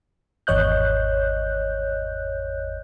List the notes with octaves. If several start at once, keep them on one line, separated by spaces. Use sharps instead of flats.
G#1 E2 C#5 D#5 F#6 G6